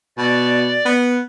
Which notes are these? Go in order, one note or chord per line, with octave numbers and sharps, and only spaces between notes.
B2 D5
B3